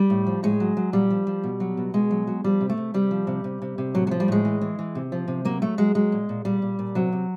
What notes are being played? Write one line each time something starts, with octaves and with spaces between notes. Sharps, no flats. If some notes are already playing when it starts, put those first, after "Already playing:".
Already playing: G3
A2
F3
A2 G#3
F#3
F#3
A#2 G3
F3
F3
B2
F#3
B2
B2 G#3
F#3
F#3
F3 G3
C3
A3
C3
C3 G3
F3
C3
C3
C3
C3
A2 F#3
F#3
F3
G3
A2 G#3
E3
E3
E3
C3
F3
C3
F#3 A#3
F#3 A3
F#3 G#3
F#3 G#3
A#2
A#2
A#2 G3
A#2
A#2
C3 F#3
C3